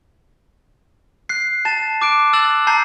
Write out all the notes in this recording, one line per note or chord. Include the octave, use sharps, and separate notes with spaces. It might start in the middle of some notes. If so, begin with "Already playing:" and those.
F#6 C7
A5 A6 E7
D6 F#6 D7
E6 F#6 A6 E7 F#7
A5 A#5 G6 C7